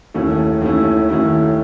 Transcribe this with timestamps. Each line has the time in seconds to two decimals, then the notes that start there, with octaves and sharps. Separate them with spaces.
0.14 D#2 D#3 A3 C#4 E4
0.62 D#2 D#3 A3 C#4 E4
1.09 D#2 D#3 A3 C#4 E4